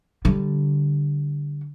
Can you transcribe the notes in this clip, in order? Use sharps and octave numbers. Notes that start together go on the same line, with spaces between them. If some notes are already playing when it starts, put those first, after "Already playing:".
D3 G3